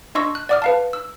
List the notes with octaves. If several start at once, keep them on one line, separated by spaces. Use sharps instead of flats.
D4 D#5 C6 C#6 E6 A#6
F#6
D5 F#5 D6 D#6 F6
B4 F5 A5
E6